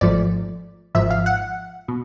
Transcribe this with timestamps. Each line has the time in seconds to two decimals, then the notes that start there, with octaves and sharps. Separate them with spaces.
0.01 G#1 G#2 F3 A3 D5
0.95 G#1 G#2 F3 E5
1.11 F5
1.26 F#5
1.88 B2